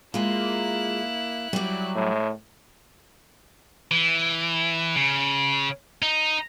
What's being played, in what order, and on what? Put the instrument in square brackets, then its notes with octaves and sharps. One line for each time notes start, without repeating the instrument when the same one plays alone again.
[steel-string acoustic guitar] G#3 F4 [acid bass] A#3 [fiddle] E4 F#6
[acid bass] F#3 [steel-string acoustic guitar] G3 D5
[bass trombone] A2
[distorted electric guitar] E3
C#3
D#4